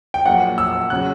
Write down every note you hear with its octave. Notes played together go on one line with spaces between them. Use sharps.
G5
A#1 A#2 F#3 F#5
E6
C#3 F#3 F#6